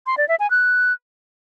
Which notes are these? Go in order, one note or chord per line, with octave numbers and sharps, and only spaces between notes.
C6
D5
E5
G#5
F#6